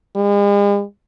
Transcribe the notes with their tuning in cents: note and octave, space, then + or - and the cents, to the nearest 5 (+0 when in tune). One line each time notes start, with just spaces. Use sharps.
G#3 -45